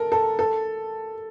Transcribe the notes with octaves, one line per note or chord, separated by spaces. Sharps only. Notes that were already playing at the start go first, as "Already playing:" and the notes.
Already playing: A4 A#4
A4
A4